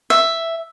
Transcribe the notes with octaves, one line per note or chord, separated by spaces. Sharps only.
E5